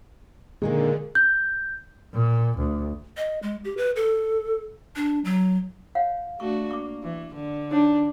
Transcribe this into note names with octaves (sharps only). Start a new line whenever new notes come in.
A#2 D3 D#3 G#3 A#3
G6
A#2
D2
D#5
G#3
G4
B4
A4
D4
F#3
C#5 F5 F#5
A3 D4 F#4 C#6
A#3 C#6 D6
E3
D3
D4 D#4 C#5